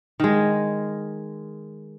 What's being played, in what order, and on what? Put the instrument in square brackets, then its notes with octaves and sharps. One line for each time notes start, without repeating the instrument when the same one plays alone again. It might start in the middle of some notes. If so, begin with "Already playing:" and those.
[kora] D#3 G#3